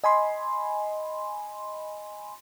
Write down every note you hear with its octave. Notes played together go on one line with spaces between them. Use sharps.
D#5 G#5 B5 C6